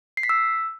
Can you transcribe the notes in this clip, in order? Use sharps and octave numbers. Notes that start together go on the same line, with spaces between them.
C7
B6
E6